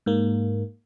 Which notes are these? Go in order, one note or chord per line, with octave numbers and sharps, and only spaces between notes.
G#2 A#3